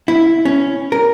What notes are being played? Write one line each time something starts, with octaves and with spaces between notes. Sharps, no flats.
E4
C#4
A#4